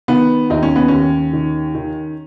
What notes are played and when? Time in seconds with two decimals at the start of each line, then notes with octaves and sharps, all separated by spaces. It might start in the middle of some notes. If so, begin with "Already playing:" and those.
0.08 D#3 B3
0.50 D#2 D#4
0.63 C#4
0.76 B3
0.88 D#2 C#4
1.33 D#3
1.75 D#3